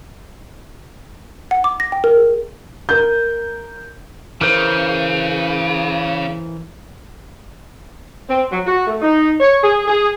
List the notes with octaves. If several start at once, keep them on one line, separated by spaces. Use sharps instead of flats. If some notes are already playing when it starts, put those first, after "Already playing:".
F#5
D6
A#6
G5
A#4
G#4
A#4 G6
C#3 E3 A#4 C5
C4
F#3
F#4
A3
D#4
C#5
G#4
G#4